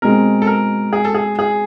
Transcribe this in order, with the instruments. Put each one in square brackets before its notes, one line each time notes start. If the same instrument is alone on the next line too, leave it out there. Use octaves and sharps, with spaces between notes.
[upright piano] B2 G#3 C4 [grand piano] A#4
[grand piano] A4
A#4
G#4
A4
G#4
G#4